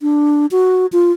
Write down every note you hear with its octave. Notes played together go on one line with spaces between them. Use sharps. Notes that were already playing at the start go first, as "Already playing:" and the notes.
D4
F#4
F4